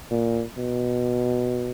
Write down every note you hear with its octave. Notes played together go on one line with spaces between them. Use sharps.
A#2
B2